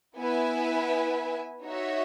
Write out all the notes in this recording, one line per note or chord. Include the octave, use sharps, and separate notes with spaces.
B3 E4 B4 E5 G#5
D#4 F#4 C#5 E5